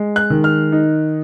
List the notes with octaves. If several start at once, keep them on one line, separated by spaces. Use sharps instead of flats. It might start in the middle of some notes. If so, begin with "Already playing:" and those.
Already playing: G#3
F#6
D#3
F6
D#4